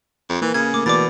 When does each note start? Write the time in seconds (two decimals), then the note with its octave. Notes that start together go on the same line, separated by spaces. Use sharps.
0.29 F2
0.42 E3 A#3
0.54 C#3 G#6
0.74 A3 A#4 D6
0.86 B2 E3 D5 D6 A6